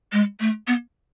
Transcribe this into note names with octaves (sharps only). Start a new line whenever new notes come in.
G#3
A3
B3